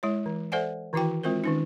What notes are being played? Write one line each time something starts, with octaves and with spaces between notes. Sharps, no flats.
G#3 E4 C#5
E3
A4 C5 D5 E5 F#5 G#5
D#3 E3 E4 F#4 G5
G#3 C4 F4 A#4 C5
D#3 C#4 D#4